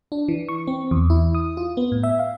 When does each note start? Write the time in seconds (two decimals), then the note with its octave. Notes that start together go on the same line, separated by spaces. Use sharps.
0.12 D4
0.28 E3
0.48 C#6
0.67 C4
0.91 E2
1.10 E4
1.35 D#6
1.57 F4
1.77 B3
1.92 A2
2.03 E5
2.19 F5